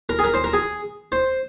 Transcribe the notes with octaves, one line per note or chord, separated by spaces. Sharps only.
A#4
G#4
A#4
C5
A#4
G#4
C5